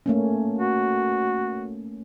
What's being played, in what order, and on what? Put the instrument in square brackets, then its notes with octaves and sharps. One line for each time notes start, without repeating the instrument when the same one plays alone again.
[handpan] A3 A#3 C#4
[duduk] F#4